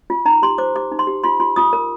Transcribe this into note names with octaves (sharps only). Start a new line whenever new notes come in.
F4
D#4 A#5
G4 C6
C5 D6
G4 D6
D#4
C6
G4
F4 C6
F4 C6
F4 D#6
A#4